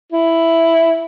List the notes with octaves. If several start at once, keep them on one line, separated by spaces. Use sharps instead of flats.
E4